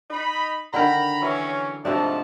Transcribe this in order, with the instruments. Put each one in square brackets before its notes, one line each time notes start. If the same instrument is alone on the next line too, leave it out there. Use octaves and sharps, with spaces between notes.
[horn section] D#4 B5
[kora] D3 D#3 A#4 [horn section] A#5 B5
[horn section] E3 F#3 C#4
[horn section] G#2 F3 A5 [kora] C3 A3 D4